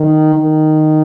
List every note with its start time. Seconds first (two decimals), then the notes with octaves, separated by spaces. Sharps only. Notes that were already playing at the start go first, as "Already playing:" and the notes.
Already playing: D#3
0.34 D#3